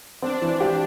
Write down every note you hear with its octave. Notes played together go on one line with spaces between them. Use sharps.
C4 D4
E3
G4